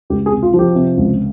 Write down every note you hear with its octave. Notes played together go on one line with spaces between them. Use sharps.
C#2 G4
G#4
C3
F4
F3
G4
C3
C#2